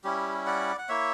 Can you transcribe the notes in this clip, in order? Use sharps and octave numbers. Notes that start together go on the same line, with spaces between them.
G3 C#4 E4 G4
D5 F#5
F#5
A#3 E4 C#5 E5